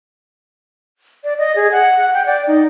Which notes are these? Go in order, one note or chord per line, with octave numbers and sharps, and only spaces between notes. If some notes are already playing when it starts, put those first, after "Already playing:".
D5
D#5
G#4
F#5
F#5
G5
D5
D#4